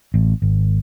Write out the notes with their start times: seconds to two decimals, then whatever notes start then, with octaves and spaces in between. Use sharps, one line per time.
0.14 A1
0.42 G#1